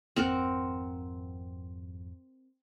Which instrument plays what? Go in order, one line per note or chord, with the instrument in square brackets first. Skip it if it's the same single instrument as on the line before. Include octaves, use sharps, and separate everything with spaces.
[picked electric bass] G#1 F2 [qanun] C4 A#4 F#5